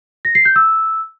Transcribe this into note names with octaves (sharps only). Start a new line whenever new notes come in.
A#6
C7
G6
E6